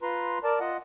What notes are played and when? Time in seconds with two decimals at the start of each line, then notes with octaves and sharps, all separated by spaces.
0.02 F4 B4 A#5 C6
0.44 A#4 D5 A5
0.60 F4 D#5 F#5